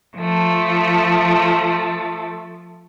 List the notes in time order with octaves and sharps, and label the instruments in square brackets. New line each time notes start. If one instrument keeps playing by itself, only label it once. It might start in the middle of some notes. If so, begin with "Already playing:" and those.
[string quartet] F3 A3